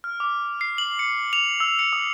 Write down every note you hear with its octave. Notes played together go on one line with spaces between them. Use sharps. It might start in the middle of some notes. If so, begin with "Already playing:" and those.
F6
D6
C7
F#7
C#7
F7
E6
C#7
D#6